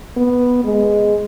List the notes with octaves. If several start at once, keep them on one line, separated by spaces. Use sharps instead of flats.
B3
G#3